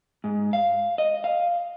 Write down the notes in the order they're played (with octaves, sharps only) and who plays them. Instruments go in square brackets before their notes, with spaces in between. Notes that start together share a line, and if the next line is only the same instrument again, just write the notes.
[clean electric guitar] G#2
F5
D#5
F5